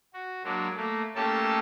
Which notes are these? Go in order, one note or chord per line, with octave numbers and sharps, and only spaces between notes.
F#4
F#3 G#3 A#3 D4
A3 A#3
A3 A#3 C#4 G4 A4 A5